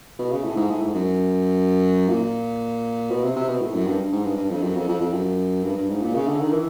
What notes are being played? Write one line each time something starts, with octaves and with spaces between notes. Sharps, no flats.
B2
C#3
A2
G#2
A2
G#2
F#2
A#2
B2
C3
C3
B2
A2
F#2
G2
G#2
G2
G2
F2
F#2
F2
F2
F2
F#2
G2
G2
G#2
A#2
C#3
D3
D#3
E3